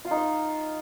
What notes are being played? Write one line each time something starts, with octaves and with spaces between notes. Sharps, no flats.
F4
D#4
D#5